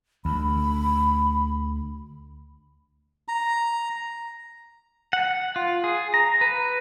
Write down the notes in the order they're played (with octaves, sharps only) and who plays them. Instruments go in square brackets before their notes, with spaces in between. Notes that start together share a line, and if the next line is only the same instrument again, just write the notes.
[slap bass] D2 [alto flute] B5
[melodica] A#5
[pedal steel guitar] F#5
F4
G#4
A#5
B4